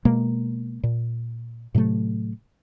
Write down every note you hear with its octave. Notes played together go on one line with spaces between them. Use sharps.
B2 G#3 A#3
A#2
A2 C3 F#3 A3